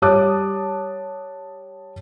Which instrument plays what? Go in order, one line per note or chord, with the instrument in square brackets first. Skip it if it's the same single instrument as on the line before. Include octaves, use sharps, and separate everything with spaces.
[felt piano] G3 C#5 A5 D6 D#6 F#6